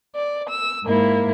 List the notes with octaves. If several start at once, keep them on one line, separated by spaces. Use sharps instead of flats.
D5
E6
G#2 A#3 E4